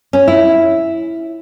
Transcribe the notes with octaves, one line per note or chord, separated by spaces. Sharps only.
C#4
E4